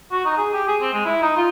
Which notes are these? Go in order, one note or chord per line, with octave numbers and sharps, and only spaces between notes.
F#4
D#4
G#4
G4
G#4
C4
G#3
E4
D#4
F4